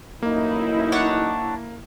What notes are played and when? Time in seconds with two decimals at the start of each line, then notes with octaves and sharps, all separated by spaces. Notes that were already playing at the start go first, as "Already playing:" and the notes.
0.22 A1 F#2 A#3 D#4 E4
0.92 D4 C#5 F#5